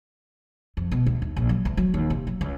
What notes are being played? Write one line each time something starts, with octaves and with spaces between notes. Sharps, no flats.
F2
B2
D2
D#2
A#1
F#3
D2
F#3
D#2
C3
F#3
C#2